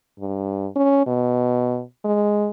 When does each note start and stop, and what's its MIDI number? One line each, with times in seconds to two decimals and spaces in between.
0.20 0.67 43
0.75 1.04 61
1.06 1.82 47
2.05 2.50 56